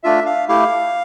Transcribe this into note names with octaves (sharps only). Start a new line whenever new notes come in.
A3 D4 F4 E5
F5
A3 E4 G4 F5